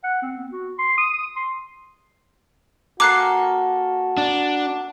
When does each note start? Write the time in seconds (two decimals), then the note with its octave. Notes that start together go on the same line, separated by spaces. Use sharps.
0.04 F#5
0.22 C4
0.37 B3
0.52 F#4
0.79 C6
0.97 D#6
1.36 C6
3.00 A#3 F#4 A4 G#5 D6 F#6 C7
4.18 D4